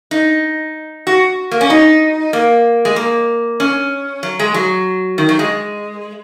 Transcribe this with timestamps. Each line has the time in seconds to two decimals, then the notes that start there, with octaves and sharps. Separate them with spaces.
0.11 D#4
1.07 F#4
1.51 A#3
1.61 C#4
1.70 D#4
2.33 A#3
2.85 G#3
2.96 A#3
3.60 C#4
4.23 F#3
4.39 G#3
4.54 F#3
5.18 D#3
5.29 F#3
5.39 G#3